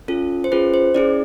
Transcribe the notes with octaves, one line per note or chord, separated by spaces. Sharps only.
C#4 F4 A4
C5
C#4 F4 G#4 B4
C5
C#4 E4 G#4 D5